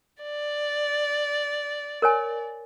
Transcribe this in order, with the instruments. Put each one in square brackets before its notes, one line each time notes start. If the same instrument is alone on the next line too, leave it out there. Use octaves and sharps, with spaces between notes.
[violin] D5
[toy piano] A#4 C#5 G#5